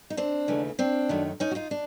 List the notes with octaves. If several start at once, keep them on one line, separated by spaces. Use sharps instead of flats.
D#4
C4 D4
D#2 C#3 E3 A3
C4 D4
F#2 D#3 F#3 A3
C#4 D#4
F#4
D#4 F4
D4